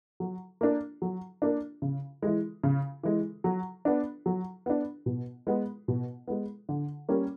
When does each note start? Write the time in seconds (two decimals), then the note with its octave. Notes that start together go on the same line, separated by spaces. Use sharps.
0.20 F#3
0.61 A#3 D4
1.02 F#3
1.42 A#3 D4
1.82 C#3
2.22 E3 G#3
2.64 C#3
3.03 E3 G#3
3.44 F#3
3.85 B3 D4
4.26 F#3
4.66 B3 D4
5.06 B2
5.47 G#3 B3
5.88 B2
6.28 G#3 B3
6.69 D3
7.09 G3 A#3 C#4